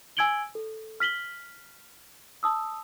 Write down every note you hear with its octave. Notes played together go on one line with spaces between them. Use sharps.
G#5 E6 G#6 D7 F#7 G7
A4
F6 B6 F#7 G7
A5 D#6 E6